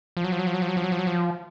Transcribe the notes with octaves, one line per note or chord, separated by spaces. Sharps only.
F3
F#3
F3
F#3
F3
F#3
F3
F#3
F3
F#3
F3
F#3
F3